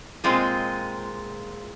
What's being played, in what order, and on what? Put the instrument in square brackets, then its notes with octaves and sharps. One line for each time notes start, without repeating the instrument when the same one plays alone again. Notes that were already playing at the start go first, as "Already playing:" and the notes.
[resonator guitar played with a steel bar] A#2 G#3 C4 F4 G#4